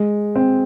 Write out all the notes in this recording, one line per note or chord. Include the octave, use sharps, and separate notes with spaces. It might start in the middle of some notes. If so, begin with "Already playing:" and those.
Already playing: G#3
C4